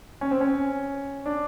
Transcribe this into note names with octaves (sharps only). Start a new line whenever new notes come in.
C#4
C4
C#4
D4